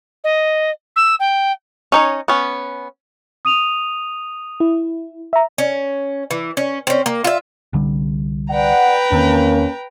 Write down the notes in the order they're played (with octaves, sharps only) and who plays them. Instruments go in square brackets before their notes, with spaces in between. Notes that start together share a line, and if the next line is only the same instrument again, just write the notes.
[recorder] D#5
E6
G5
[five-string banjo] C#4 D#4 C#5
B3 C#4
[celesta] D#6 D#7 F7
[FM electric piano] E4
E5 A#5
[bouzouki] C#4
E3
C#4
C4 C#4
A#3
F4 E5
[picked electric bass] C2 D3 G3
[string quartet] B4 G5 A#5 [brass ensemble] D5 F#5
[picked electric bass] E2 D#3 C4 [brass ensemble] A#3 C#4